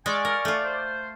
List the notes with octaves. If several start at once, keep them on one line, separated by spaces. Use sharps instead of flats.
G#3 D5 F5 G#5 C#6
A#4
A3 F4
C5